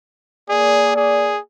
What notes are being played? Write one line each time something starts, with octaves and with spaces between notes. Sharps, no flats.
A#3 G#4 D5
G#4